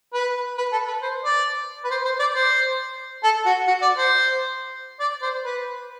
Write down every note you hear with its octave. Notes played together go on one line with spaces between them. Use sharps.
B4
B4
A4
B4
C5
D5
B4
C5
C5
D5
C5
A4
F#4
F#4
D5
C5
D5
C5
B4